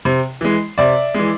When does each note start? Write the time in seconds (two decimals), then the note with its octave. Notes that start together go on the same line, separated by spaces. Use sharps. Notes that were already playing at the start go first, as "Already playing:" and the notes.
0.05 C3
0.41 E3 G#3
0.78 C3 D5 E5
1.14 E3 G#3